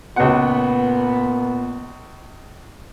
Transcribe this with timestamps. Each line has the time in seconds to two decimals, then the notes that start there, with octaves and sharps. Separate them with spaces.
0.16 C#2 A#2 B3 F#5